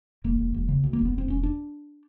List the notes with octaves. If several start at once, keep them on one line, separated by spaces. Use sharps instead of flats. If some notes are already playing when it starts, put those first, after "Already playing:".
E1 A#3
E1
E1
C#3
D2
A#3
E1
B3
E1 C4
E1 C#4
D4